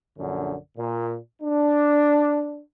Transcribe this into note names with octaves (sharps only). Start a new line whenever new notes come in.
A#1 F#2 D3
A#2
D4